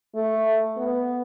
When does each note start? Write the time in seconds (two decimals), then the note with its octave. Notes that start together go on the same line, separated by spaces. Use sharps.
0.15 A3
0.77 B3